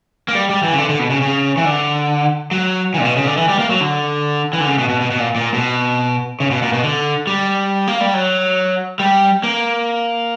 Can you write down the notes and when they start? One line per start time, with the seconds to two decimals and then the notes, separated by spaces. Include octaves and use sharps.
0.28 A#3
0.35 G3
0.49 G3
0.63 E3
0.73 C#3
0.78 D3
0.89 D3
0.99 B2
1.10 C#3
1.21 C#3
1.57 E3
1.65 D3
2.51 F#3
2.94 E3
3.00 A#2
3.05 B2
3.17 C#3
3.26 D3
3.37 E3
3.49 G3
3.59 A#3
3.70 F#3
3.81 D3
4.53 E3
4.60 D3
4.67 C#3
4.79 B2
4.89 B2
5.00 B2
5.11 B2
5.20 A#2
5.36 A#2
5.54 B2
6.40 C#3
6.51 B2
6.62 A#2
6.73 B2
6.84 D3
7.27 G3
7.88 A#3
8.01 G3
8.14 F#3
8.99 G3
9.44 A#3